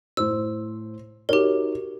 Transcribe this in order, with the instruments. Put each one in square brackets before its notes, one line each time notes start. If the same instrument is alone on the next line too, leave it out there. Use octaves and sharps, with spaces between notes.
[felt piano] A2 C5 [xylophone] E6
[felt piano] D#4 F#4 C#5 [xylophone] G4 A#4